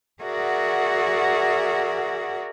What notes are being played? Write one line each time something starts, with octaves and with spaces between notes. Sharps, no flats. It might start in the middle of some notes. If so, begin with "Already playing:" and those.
F#4 G#4 A#4 D5 E5 F#5